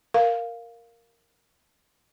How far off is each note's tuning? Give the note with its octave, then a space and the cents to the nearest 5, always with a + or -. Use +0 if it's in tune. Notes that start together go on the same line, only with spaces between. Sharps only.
A#4 -5 F5 +0